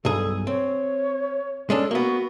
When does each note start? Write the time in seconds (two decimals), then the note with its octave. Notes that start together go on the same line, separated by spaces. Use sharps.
0.05 B1 G2 G#4 A4
0.47 C4 C#5
1.70 G#3 C#4 D4 A4
1.91 A#3 B3 F#4